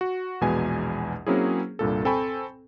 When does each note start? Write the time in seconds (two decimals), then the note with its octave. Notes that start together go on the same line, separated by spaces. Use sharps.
0.01 F#4
0.41 A#1 E2 B2 G#3 G#5
1.26 F#3 A#3 C4 C#4 E4 G#4
1.79 C2 G2 A#2 A4
2.05 C4 A4 G5 G#5 B5 C#6